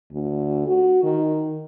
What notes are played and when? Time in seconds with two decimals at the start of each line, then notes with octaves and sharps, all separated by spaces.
0.12 D2
0.67 F#4
1.03 D#3